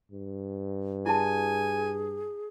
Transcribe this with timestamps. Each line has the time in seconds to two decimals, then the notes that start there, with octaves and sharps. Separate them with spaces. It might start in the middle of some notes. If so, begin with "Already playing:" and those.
0.11 G2
1.06 E4 G#4 G#5 A5